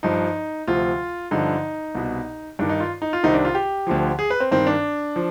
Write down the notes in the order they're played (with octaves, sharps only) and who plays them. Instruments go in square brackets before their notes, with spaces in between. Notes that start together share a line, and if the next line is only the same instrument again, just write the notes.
[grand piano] G2 F3 D#4
D2 C3 F3 F4
G2 D3 F3 D#4
C2 B2
G2 D#3 D4
D#4
F4
D#4
F4
C2 C3 D#3 D#4
D4
F4
G4
D2 D3 F3
G#4
B4
C4
G2 D#3 C4
D4
F3